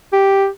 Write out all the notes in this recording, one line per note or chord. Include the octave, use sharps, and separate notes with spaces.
G4